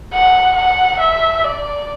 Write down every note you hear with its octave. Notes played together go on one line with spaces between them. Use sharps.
F#5
F#5
E5
D5